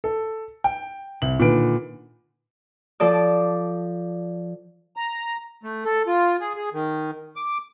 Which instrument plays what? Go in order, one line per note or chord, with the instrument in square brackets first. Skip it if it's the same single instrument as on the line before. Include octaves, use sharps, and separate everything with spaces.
[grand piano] A4
G5
C2 F#7
A#2 D3 D#3 B4 D7
[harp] F3 A4 D5 D6
[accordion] A#5
A3
A4
F4
G#4
G#4
D#3
D6